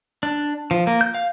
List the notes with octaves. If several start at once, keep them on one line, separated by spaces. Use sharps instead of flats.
D4
F3
A#3
G6
F5